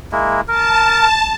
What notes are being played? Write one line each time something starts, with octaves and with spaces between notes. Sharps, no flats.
G#3 A#3 E4
A#4 A5